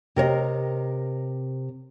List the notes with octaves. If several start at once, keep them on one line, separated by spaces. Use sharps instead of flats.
C3 A#4 C#5 D#5